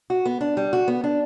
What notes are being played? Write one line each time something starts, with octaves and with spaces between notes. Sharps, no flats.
F#4
B3
D4
G3
F#4
B3
D4